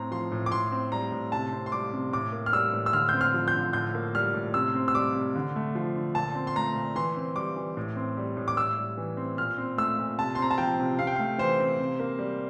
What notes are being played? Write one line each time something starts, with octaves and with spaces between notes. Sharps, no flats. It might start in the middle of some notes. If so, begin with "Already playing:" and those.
Already playing: A2 C4 A#5
F3 C6
A2
D6
A2 C6
C4
G3 A#5
A2
C3 A5
C4
C6
G3 D6
C3
A2 D6
A#3
F6
G3 E6
A2
E6
D3 F6
C4 G6
F6
F3
G6
D3
A2 G6
A#3
G3 F6
A2
C3 E6
C4
E6
G3 D6
C3
D3
A3
F3
D3
A#2 A5
C4
C6
A3 A#5
A#2
E3 C6
C4
G3 D6
E3
A2
C4
G3
A2
D6
A2 E6
G3
E3
C4
A#2 F6
C4
A3 E6
A#2
C3 A5
C6
C4 A#5
A5
F3 G5
C3
C3 F5
G5
A3 F5
E3 C5
C4
C3
A#3
G3